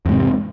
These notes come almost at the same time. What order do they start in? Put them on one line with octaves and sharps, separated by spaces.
E2 G#2 C3